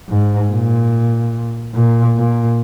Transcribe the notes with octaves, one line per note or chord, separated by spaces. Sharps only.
G#2
A#2
A#2
A#2